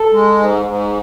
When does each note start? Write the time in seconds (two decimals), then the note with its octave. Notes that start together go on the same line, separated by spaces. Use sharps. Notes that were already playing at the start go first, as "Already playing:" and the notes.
Already playing: A4
0.12 G#3
0.39 G#2
0.65 G#2